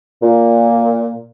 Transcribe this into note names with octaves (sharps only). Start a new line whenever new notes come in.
A#2